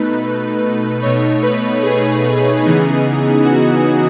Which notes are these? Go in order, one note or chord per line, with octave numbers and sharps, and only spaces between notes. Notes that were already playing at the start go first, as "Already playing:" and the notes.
Already playing: B2 A3 D#4 B4
B2 A3 D#4 C#5
B4
G#4
C#3 E3 B3 D#4
F#4